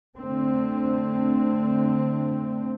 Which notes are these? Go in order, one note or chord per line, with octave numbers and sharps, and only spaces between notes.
D3 A3 C4